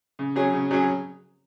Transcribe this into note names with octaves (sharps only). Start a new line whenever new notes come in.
C#3
F#3 C#4 G#4
C#3
F#3 C#4 G#4